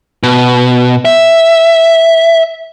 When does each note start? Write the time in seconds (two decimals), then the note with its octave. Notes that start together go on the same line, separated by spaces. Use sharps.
0.23 B2
1.05 E5